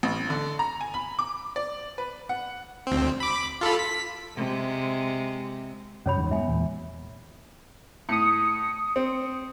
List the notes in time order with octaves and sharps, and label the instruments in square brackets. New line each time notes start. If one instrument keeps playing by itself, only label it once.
[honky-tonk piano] A1
D3
A#5
G#5
B5
D6
D5
B4
F#5
[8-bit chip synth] D2 C4
B5 D6
F4 A4 B5
B6
[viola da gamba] C3 G#3
[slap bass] F#2 C3 F#3 [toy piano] C#4 C#5 B5
[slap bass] E2 G#2 C#3
[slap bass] G#3 A3 B3 [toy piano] E5 G#5
[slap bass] E2 A#2 E3
[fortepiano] A2 [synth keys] D#6 C#7
[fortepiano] C4